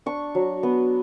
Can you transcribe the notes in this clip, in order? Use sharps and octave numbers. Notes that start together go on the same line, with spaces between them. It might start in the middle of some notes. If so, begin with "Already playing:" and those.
D4 C#6
F#3
B3